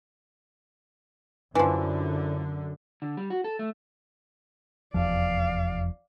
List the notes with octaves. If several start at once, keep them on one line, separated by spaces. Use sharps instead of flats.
F#2 D3 E3 F3
D3
G3
F#4
A4
A3
F1 E2 F3 D5 F5